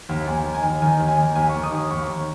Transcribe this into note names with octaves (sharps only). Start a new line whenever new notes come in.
D#2
D#2 G#5
D#3
G#5
D#2
D#3 G#5
D#2
G#5
D#3
D#2 G#5
C#6
D#3
D#6
D#2
D#2 C#6
D#2